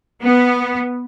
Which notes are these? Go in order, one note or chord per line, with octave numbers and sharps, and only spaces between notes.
B3